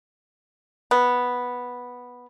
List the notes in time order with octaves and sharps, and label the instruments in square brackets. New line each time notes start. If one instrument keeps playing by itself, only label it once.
[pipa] B3